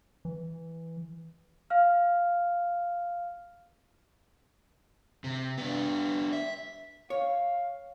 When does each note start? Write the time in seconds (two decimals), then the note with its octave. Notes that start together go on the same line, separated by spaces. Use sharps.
0.25 E3
1.70 F5 F6
5.24 C3
5.58 B3 D4
6.33 E5
7.10 C#5 F5